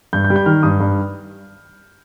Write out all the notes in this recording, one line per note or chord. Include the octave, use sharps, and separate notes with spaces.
G2 G6
G6
G3
G6
D#3 F6
G2 D#6
G2